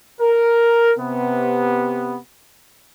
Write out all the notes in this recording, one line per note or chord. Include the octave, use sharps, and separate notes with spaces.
A#4
C3 B3